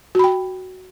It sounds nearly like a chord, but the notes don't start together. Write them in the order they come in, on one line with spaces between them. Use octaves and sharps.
F#4 B5 G5